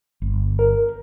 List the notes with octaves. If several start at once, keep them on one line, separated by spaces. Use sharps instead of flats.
G1
A#4